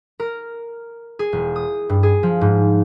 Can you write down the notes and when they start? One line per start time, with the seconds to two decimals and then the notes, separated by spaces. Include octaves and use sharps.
0.20 A#4
1.19 G#4
1.32 E1
1.56 D#6
1.89 G2
2.03 G#4
2.23 F3
2.41 G#2